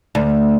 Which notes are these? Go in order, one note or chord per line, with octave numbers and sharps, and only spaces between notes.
D2